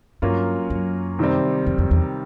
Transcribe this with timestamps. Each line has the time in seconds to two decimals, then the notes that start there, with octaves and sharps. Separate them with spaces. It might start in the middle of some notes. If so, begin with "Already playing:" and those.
0.22 G2 F#3 A#3 C#4 F4
0.70 F#2
1.19 C3 D#3 G3 C4
1.66 F2
1.78 F2
1.91 E2